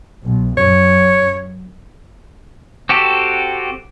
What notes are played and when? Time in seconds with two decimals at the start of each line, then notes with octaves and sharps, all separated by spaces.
0.24 B1
0.57 F#2 C#5
2.89 C4 F#4 G4 A4